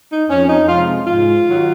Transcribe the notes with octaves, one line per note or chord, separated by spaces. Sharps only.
D#4
F2 C#4
D#4
C3 F3 G#3 F4
G#2 F4
D#3 F#3